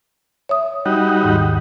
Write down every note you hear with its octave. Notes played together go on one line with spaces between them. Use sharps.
C#5 E5 D#6
G3 D#4 F#4
D#2 G#2 D#3